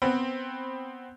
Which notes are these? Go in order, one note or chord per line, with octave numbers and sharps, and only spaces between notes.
B3 C4